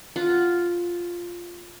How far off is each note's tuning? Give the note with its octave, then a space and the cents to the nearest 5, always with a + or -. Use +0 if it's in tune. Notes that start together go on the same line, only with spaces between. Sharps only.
F4 +0 F#5 +0